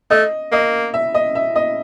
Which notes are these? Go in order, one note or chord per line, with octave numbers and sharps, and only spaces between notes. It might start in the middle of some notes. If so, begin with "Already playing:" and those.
A3 D#5
A#3 D#5
E5
D#5
E5
D#5